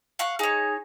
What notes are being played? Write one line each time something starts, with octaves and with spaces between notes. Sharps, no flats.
F5 F#5 C#6
D#4 G#4 C#5